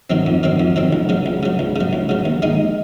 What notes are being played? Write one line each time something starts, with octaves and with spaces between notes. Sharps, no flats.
D#3 F#3 C4
F2
D#3 F#3 C4
F2
D#3 F#3 C4
C#2
C#3 F#3
C#2
C#3 F#3
C#2
C#3 F#3
C#2
C#3 F#3
D#2
D#3 G#3 D#4